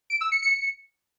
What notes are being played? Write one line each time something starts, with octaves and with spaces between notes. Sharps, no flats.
D7
E6
C#7
C#7